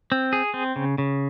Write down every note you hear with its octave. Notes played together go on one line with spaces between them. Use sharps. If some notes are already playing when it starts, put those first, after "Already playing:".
C4
G#4
C4
C#3
C#3